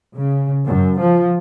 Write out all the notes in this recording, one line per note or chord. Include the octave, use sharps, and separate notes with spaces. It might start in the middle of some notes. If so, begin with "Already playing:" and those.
C#3
F#2
F3